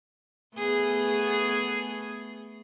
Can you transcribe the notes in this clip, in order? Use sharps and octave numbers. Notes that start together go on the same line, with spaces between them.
A3 B3 G#4